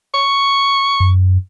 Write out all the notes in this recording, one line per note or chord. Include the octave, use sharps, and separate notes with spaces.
C#6
F#2